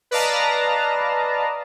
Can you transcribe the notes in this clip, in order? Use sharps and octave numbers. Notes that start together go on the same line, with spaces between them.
B4 D5 D#5 F5 A5 A#5